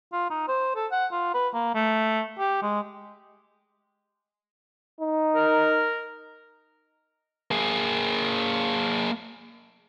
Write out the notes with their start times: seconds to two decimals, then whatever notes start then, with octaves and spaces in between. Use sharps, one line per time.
0.13 F4
0.30 D#4
0.48 C5
0.76 A4
0.92 F#5
1.12 F4
1.34 B4
1.54 A#3
1.75 A3
2.39 G4
2.62 G#3
5.00 D#4
5.34 A#4
7.51 A#3 G#4